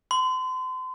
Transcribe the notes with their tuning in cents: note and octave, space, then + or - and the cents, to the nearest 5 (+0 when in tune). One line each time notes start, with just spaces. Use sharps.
C6 -35